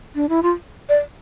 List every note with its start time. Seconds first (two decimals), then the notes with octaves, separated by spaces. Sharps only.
0.15 D4
0.29 E4
0.43 F4
0.89 D5